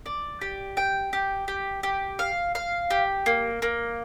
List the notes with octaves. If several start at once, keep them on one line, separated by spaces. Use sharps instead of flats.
D5
G4
G5
G4
G4
G4
F5
F5
G4
A#3
A#3